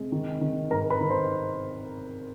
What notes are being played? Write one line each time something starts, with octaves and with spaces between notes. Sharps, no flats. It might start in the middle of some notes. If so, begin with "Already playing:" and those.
Already playing: C3 G#3
D#3
D#3
G#2 A#4 A#5
B4 B5
D#3
C5 C6